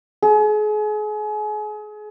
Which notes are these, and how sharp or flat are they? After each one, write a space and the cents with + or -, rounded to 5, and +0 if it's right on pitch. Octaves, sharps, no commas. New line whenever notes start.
G#4 +35